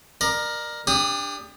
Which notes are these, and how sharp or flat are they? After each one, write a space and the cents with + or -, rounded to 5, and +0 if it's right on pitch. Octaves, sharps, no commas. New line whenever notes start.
A#4 +10 D5 +35
D4 +0 G4 +30 D#6 +0